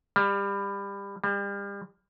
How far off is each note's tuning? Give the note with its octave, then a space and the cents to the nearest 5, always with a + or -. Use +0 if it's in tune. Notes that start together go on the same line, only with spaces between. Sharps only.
G3 +25
G3 +35